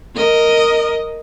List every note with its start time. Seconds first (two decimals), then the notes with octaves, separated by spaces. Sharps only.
0.16 A#4 D#5